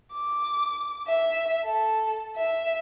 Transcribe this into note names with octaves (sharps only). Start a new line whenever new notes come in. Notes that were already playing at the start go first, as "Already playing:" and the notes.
D6
E5
A4
E5